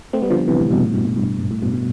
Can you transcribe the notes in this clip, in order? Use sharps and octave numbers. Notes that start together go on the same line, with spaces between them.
A3 C4
G3 B3
D3 F3
C3 E3
A2 C3
G2 B2
A2
G2 B2
A2
G2
G2
A2
G2 B2
B2